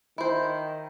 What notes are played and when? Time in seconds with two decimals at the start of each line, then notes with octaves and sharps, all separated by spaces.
0.18 D#3 E4 C5